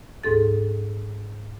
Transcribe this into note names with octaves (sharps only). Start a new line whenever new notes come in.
D2 G#2 A4 A6